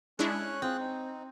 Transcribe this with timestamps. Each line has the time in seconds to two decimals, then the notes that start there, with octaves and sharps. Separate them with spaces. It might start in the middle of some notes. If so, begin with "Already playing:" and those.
0.19 G#3 C#4 D4 E4 C#5 F#6
0.62 C4 F4 G#4 F#6
0.80 D#4